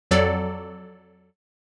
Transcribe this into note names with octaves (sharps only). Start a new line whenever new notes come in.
F2 F#3 A4 D5